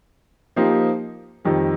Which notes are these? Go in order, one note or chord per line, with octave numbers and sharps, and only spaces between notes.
F3 A#3 D#4 G4 C5
F2 D#3 G3